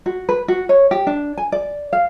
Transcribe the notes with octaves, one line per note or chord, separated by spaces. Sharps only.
F#4
B4
F#4
C#5
G4
D4
G#5
D5
F5